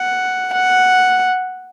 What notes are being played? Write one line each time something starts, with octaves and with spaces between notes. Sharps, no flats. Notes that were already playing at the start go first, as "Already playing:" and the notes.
Already playing: F#5
F#5